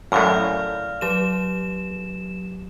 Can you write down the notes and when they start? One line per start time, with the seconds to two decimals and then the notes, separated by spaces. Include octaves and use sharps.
0.12 F#2 A2 D5 F5 F6
1.01 F#3 G4 E7